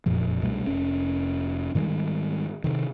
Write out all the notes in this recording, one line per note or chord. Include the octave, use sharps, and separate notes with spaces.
F#1 F2 A#2 F3
C2 B2 G3 A3
F1 C#4
G#2 D#3 G3 G#3
C3 D#3